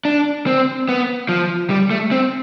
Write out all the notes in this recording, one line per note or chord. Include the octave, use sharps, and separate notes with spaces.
D4
C4
B3
F3
G3
A3
C4